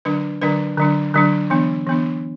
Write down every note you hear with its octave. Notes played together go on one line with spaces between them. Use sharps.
D3 F#3 D4 B4
D3 F#3 D4 B4
D3 F#3 D4
D3 F#3 D4
E3 B3 D4
E3 B3 D4